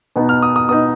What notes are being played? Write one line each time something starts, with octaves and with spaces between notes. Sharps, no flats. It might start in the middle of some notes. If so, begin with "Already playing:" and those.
B2 B3 D#4
F6
D#6
D#6
B2 B3 D#4 D#6